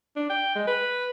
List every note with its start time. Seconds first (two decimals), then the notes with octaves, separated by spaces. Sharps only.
0.16 D4
0.30 G5
0.55 G#3
0.67 B4